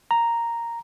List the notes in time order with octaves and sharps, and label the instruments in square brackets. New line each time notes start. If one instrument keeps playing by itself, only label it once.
[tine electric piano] A#5